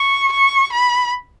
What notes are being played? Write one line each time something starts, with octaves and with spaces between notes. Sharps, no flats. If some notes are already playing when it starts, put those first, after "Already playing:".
Already playing: C#6
C#6
B5